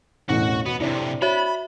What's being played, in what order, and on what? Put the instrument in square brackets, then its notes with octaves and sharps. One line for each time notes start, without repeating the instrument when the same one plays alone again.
[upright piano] E1 A1 A2 [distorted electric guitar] F#4
[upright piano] B2 [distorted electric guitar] B3
[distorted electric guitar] A2 C3 [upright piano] C4 D4 E4
[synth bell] F#4 C#5 E5 [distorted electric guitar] B5